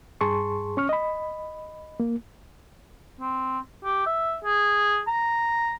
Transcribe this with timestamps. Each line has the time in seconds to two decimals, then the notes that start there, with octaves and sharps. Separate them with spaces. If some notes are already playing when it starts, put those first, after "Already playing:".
0.21 G2 G#4 A5 C6 C#6
0.77 C#4 C#6 F6
0.89 D#5 B5
2.00 A#3
3.20 C4
3.84 G4
4.06 E5
4.44 G#4
5.07 A#5